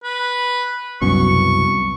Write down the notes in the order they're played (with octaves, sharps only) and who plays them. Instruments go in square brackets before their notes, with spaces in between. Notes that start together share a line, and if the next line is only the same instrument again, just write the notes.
[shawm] B4
[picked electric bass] C2 F#2 B2 [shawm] C#6